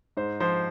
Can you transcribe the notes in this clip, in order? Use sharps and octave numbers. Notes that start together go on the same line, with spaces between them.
G#2 C5
F3 C5